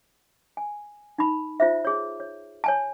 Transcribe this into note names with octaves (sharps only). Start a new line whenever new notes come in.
G#5
D#4 B5
F4 C5 E5
G#4 C#5
C#5
C#5 G#5 A5